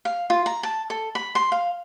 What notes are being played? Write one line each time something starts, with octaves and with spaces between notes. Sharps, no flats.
F5
F4
A#5
A5
A4
B5
C6
F5